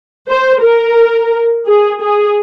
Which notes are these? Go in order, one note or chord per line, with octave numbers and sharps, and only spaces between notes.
C5
A#4
G#4
G#4